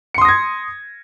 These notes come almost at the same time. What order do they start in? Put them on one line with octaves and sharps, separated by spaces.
C#7 C6 D#6 A#6 G#6